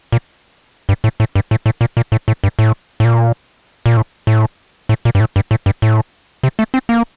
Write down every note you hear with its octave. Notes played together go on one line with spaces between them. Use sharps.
A#2
G2
A2
A2
G2
A2
A2
A#2
A#2
A2
A2
G2
A2
A2
A#2
A#2
A2
A2
A2
A#2
G2
A2
G2
A2
G2
A2
C3
A3
C4
A#3